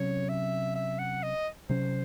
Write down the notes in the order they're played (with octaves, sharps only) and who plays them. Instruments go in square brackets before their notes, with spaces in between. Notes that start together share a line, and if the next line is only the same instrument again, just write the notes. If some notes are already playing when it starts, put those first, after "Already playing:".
Already playing: [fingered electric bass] C3 F#3 C#4 [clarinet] C#5
[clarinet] E5
E5
F#5
D#5
[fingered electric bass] C3 F#3 C#4 [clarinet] C5